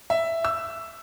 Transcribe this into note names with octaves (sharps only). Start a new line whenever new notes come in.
E5
E6